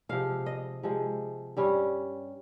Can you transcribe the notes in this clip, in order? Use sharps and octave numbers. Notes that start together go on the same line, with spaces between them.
C3 F3 G#3 F5
D#5
C3 F3 G#3
G2 G3 C#4